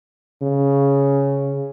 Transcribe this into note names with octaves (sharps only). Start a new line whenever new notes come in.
C#3